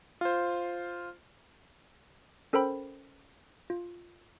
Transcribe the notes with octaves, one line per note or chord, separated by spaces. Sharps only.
F4 C5
C#4 A4 A#4 C5 G5 B5
F4